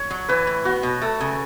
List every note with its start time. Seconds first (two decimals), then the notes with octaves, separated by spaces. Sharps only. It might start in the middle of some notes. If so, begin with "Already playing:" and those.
Already playing: C#5
0.11 F#3
0.28 E3 B4
0.47 A2
0.65 B3 F#4
0.83 B2
1.01 A3 A4
1.21 C#3